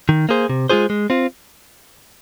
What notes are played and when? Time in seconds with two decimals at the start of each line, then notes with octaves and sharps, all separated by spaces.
0.09 D#3
0.29 A#3 G#4 C5
0.49 C3
0.70 G#3 F4 G#4 C5
0.90 G#3
1.10 C4 F4